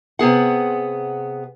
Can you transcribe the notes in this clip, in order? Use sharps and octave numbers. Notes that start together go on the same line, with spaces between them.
C3 B3 G#4 F#5